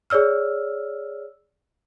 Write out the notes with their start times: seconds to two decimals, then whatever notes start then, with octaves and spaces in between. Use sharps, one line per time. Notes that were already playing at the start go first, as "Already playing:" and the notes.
0.10 G#4 C#5 D5 E6 F6